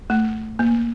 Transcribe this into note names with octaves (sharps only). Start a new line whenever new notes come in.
A3
A#3